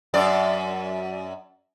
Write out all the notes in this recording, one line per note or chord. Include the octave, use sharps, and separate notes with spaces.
F#2 D5